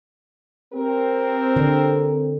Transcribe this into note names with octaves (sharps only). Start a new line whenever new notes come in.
C4 G4 A#4
D3